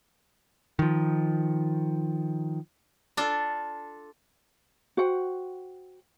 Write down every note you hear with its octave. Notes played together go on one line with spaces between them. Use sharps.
D#3 F3
D4 F4 A4
F#4 C5 F#5 G5